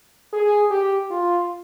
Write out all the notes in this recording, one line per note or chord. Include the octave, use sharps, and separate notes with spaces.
G#4
G4
F4